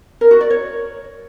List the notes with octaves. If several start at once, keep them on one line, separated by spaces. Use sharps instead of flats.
A#4
F#4
D5
C#5